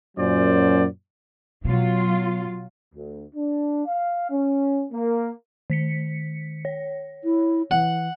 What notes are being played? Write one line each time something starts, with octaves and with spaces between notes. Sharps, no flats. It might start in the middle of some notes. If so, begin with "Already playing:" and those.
F#2 A#2 F#3 C#4 C5 D5
B2 F#3 F4
D2
D4
F5
C#4
A#3
D#3 B6 C#7
C#5
E4
E3 F#5